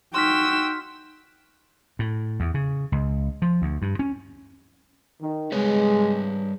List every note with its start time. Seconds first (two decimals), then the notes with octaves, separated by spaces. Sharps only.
0.14 D#4 F#4 G5 C6 E6 F6 B6
1.99 A2
2.40 E2
2.54 C#3
2.92 C#2
3.42 F3
3.62 D2
3.82 G2
3.99 C#4
5.21 D#3
5.52 G3 G#3 B4 C#5